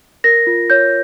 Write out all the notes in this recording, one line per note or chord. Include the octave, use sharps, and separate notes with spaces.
A#4 A#6
F4
C#5 G6